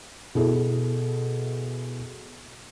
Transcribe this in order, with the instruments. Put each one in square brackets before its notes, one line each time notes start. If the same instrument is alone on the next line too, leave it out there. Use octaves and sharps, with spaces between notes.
[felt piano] B2 E4 G#4 A4